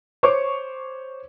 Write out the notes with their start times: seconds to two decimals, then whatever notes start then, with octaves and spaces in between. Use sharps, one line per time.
0.23 C5 C#5 C#6 D6